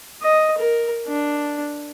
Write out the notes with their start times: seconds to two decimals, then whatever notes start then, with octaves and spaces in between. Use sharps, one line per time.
0.22 D#5
0.58 A#4
1.07 D4